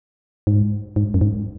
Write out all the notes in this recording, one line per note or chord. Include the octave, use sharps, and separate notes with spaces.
G#2
G#2
F#2
G#2